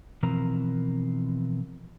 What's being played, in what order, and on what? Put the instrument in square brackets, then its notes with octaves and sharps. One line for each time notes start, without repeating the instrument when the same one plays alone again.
[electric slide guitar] B2 E3 F3 C4 A#4 A#5